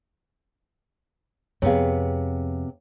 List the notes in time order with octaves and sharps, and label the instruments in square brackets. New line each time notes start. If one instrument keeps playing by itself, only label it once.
[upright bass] F2 [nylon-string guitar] C3 B3 G#4 [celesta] C#5 F5